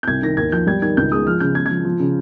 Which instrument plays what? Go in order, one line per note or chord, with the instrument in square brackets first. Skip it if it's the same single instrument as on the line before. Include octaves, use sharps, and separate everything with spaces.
[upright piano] G6
C2 G#6
D#3 A#6
D#2 G#6
F3 G6
G3 G#6
D#3 G#6
C#2 G6
G#3 D#6
F3 F6
C#3 G6
G#3 G#6
G#6
F3
F3
C#3